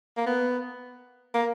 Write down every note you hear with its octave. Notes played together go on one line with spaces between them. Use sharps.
A#3
B3
A#3